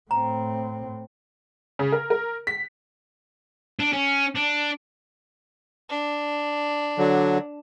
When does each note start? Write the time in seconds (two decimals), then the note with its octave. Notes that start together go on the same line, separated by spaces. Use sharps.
0.11 A2 C4 A#5
1.79 C#3
1.92 A#4
2.10 A#4
2.47 B6
3.80 D4
3.93 C#4
4.35 D4
5.89 D4
6.98 D3 F#3